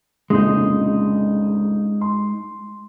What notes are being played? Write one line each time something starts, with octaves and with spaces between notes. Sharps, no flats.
F1 A#1 C#3 G#3 D#4
C6